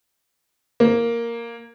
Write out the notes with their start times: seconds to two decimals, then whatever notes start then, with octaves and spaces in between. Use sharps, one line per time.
0.80 A#3